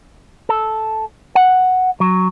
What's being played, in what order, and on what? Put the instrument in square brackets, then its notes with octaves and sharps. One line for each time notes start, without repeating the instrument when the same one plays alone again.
[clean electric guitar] A4
F#5
F#3